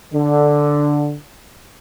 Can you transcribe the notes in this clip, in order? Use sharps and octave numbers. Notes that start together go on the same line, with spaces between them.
D3